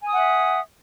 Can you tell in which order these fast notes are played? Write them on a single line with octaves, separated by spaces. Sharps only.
G#5 D#6 F#5 E5